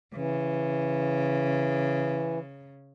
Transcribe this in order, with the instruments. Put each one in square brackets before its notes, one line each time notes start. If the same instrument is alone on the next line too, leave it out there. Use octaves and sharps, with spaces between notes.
[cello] C#3 [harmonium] E3